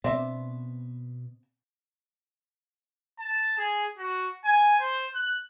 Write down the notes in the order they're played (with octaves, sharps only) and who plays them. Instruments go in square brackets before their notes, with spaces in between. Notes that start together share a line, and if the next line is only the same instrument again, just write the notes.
[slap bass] B2 B3 [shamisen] C4 D4 E5
[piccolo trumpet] A5
G#4
F#4
G#5
C5
F#6